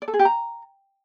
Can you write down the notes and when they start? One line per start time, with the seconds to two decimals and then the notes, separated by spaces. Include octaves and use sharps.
0.02 D5
0.08 A4
0.14 G#4
0.19 G4
0.25 A#5